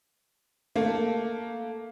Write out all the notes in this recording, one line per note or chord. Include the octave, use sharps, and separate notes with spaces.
A3 A#3